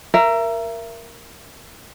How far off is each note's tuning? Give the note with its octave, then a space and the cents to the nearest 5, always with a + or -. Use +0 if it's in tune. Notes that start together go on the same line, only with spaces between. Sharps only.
A#4 +0 E5 +30